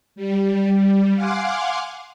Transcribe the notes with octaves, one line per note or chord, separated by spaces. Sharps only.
G3
F5 F#5 G#5 C6 D6